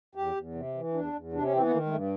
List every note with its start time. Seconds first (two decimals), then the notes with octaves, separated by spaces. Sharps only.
0.15 E2 G4
0.35 E2
0.55 C3
0.74 E3
0.94 E2 D4
1.13 E2
1.32 C3 D4
1.43 C#4
1.52 E3 C4
1.62 B3
1.71 D#3 A#3
1.86 G#3
1.90 G2 A3